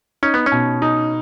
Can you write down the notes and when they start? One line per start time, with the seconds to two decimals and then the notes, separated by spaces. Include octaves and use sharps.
0.23 C#4 D#4
0.34 B3
0.46 C#4
0.52 B2
0.82 D#4